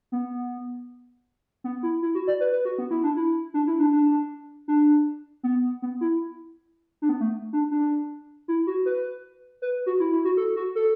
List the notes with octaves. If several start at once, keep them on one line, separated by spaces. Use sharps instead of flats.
B3
B3
E4
E4
F#4
D5
B4
B4
F#4
B3
E4
D4
E4
D4
E4
D4
D4
D4
B3
B3
E4
D4
B3
A3
D4
D4
E4
F#4
B4
B4
F#4
E4
E4
F#4
A4
F#4
A4